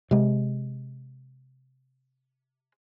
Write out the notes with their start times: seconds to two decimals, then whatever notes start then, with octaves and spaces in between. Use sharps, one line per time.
0.11 C3 G#3